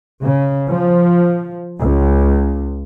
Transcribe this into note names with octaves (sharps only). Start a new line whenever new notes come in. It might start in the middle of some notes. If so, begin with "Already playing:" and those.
C#3
F3
C#2